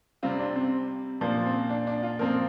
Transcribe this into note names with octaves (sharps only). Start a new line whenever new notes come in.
C3 G3 C4 F4
D4
C4
A#2 F3 A#3 D4
C4
D4
D4
F4
A#2 F3 C4 A#4